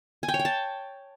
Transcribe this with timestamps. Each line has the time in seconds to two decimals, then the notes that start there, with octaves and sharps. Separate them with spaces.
0.23 G#5
0.28 G5
0.34 C#5
0.39 G5
0.45 A5